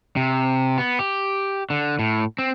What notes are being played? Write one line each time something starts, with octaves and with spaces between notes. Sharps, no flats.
C3
B3
G4
D3
A2
C4